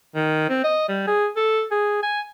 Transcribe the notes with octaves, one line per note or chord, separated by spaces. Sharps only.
D#3
C4
D#5
G3
G#4
A4
G#4
G#5